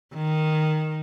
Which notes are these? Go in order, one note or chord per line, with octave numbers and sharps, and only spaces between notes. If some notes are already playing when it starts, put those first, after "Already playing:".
D#3